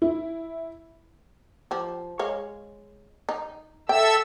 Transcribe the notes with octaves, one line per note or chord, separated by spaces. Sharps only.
E4
F3 G4
G#3 C#5 F5
D#4
A4 E5 G5 E6